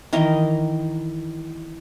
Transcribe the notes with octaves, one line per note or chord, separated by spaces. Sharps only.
D#3 E3 A#4 D#5